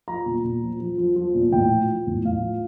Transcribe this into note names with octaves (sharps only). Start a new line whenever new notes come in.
F3 A#5
A#2
A#2
F3
F3
F3
F3
A#2
A2 G5
F3
F3
A2
A2 F5
F3